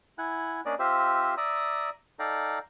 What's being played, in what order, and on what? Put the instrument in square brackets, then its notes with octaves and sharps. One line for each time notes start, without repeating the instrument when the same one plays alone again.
[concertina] E4 F#5 G#5 F#6
A#3 C#4 D4 D5 D#5
C4 F4 G4 C5 E5
D5 E5 A#5 D#6 E6
D#4 A4 D5 F5 G5 A#5